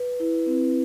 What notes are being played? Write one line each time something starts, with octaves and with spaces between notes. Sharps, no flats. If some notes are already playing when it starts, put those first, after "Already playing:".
Already playing: B4
E4
C4